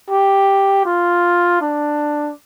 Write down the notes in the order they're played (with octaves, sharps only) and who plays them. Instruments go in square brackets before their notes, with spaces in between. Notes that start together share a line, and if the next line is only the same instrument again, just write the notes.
[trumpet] G4
F4
D4